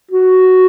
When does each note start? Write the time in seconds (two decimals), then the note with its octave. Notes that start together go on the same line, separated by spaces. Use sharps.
0.11 F#4